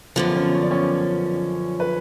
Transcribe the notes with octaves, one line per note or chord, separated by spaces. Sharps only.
F#2 D3 F3 B3 B4
C#4 C#5
C#5
D5
C#4 C#5
B4